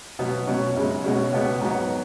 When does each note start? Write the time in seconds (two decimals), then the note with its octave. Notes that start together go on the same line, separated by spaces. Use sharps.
0.19 B2 F#3 B3
0.47 B2 F#3 C#4
0.76 F#2 C#3 G#3
1.04 B2 G#3 C#4
1.32 C#2 B2 G#3 B3
1.61 G#2 D#3 F#3 B3